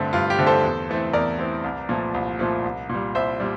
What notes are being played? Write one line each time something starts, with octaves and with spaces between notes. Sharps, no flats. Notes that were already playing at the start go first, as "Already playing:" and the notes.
Already playing: G2 D3 A3 C4
G2 F4
G4
D3 A3 C4
A4 C5
E2
E3 A3 C4
E2 A#4 D5
E3 A3 C4
C2
A#2 F3 A3
C2
A#2 F3 A3
C2
A#2 G3
C2 C5 E5
A#2 G3